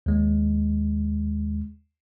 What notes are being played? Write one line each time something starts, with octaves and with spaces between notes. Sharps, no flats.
D#2 G#3